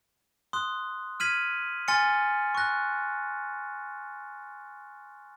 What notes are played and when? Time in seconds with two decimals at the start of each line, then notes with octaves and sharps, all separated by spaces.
0.53 C6 D#6 F#6
1.20 F6 G#6 B6 D#7 F#7
1.88 G#5 C6 F6 A6 C#7
2.55 C#6 F#6 A#6